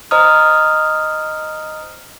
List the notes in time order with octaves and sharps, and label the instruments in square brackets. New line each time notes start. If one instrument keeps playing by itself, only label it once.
[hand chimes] C5 D#5 A#5 D#6 F6